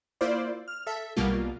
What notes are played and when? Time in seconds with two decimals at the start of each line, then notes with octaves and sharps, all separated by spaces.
0.21 A#3 E4 F4 C5 D5
0.68 F6
0.87 A4 E5
1.17 B1 B2 G3 A#3 F4